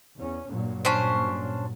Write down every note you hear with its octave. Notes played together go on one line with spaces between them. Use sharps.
E2 C#4
G2 A#2 F#3
C#4 D4 C5